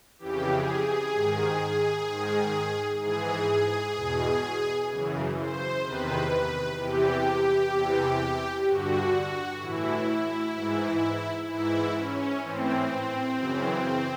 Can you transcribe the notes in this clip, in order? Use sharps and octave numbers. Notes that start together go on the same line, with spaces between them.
F2 C#3 E3 G4
G#4
G#4
G#2 D#3
G#2 D#3
G#2 E3 G#4
E2 B2
F#2 C#3 E3
C5
E2 C3 D#3 B4
E2 C3 E3 G4
E2 C3 E3
G2 D3 F#4
A2 E3 E4
G#2 E3
G#2 E3 E4
C#4
A2 E3 C4
F#2 C#3 E3